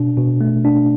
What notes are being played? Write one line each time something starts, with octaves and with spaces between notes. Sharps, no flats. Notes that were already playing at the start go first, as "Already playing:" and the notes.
Already playing: B2 D4
B2
A3
D4